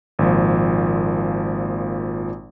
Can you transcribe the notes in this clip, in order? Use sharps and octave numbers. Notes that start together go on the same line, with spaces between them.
G#1 A#2 F3